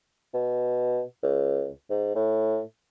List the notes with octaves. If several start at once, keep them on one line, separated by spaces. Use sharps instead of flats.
B2
C#2
G#2
A2